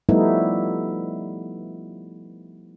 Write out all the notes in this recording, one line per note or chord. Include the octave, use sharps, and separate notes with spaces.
F3 G3 A3 B3 D#4 E4